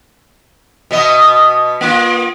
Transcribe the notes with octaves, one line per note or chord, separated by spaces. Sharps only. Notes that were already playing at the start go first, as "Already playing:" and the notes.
B2 B3 D#5
A#3 F4